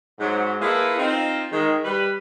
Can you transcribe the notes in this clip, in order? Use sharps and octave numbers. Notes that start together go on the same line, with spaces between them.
G#2 F#3
A#3 E4 F4 G#4 A4 B4
C4 D#4 F4
D#3 G#3
G3 B4